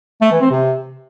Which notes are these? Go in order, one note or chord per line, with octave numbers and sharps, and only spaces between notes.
A3
E3
C4
C3